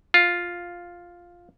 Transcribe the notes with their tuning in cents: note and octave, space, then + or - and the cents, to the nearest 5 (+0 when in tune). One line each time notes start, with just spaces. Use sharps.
F4 +5